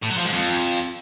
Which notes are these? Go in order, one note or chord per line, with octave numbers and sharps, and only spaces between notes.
A2
F#3
F3
G#2
F2